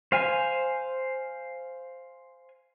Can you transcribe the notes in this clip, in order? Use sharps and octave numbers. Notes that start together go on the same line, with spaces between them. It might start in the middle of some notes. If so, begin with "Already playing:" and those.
C5 F5 G#5